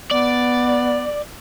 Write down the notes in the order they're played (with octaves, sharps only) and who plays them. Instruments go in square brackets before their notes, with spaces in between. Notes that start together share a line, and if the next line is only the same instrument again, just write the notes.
[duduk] B3 [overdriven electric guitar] D5